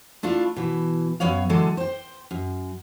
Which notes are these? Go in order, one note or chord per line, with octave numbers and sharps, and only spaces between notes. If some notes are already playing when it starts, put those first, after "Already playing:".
A3 D4 E4 F4
B2 E3
F#2 F#3 B3 C#5 F5
D3 E3 F#3 G#3 A4
C5 G5
F#2